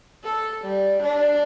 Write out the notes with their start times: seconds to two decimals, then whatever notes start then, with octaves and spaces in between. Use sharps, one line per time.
0.24 A4
0.64 G3
1.03 D4